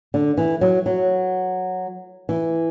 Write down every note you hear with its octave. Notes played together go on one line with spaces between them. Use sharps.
D3
E3
F#3
F#3
E3